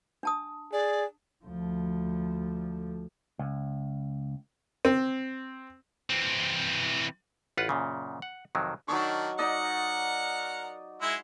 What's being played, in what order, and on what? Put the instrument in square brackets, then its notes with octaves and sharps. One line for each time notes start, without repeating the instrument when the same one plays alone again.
[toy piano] D4 A5 D#6
[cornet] G#4 [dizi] D5
[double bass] D2 F3
[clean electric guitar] C#2
[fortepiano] C4
[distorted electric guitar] E3 C4
[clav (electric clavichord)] A1 F4 B4 F#5
F#2 A#2 C#3
F#5
F2 C3 D#3 F#3
[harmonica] D#3 D4 [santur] F#3 D#4 C#6
[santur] D#4 D5 D#5 [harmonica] A#4 F#5
[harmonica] G#3 E4 E5